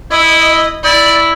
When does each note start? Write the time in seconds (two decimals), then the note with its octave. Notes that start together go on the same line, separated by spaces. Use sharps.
0.11 E4 D#5
0.84 E4 D5